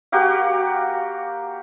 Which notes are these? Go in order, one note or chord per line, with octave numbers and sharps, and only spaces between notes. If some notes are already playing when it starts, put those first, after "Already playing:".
A#3 F#4 G4 F5